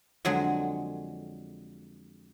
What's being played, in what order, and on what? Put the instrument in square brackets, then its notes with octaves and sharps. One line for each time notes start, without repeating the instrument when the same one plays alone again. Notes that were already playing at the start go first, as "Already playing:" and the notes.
[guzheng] F2 D3 F#3 G#3 G#4